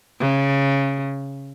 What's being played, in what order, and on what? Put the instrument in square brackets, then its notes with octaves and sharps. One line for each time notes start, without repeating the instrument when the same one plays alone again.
[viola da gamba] C#3